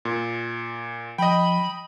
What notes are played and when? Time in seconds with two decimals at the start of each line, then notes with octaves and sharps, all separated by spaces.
0.05 A#2
1.18 F3 D#5 G5 B5